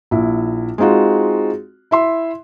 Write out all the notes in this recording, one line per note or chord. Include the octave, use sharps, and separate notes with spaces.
A#1 E4
G#3 C4 D#4 F4 F#4
E4 E5 C6